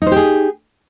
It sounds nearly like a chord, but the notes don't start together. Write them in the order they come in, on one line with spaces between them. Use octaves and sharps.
D#4 C5 G4 G#4